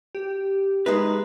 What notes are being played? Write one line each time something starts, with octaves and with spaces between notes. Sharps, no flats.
G4
G#3 D#4 B4